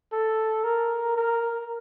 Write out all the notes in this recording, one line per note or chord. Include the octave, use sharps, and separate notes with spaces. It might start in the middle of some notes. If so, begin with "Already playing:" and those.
A4
A#4
A#4